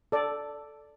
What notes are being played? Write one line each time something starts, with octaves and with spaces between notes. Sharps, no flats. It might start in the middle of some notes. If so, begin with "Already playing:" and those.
A4 D5